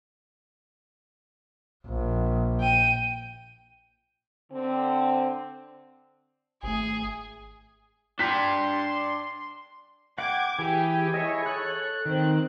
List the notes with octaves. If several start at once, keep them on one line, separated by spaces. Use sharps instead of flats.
A#1
G5 D#7
D3 C4
G#1 A3 G#4
D4 G5 C6 B6
F#5 G5 D6 G#6
E3 G4 G#4 G#5
E4 C#5 D#5
A4 F#6
D#3 C4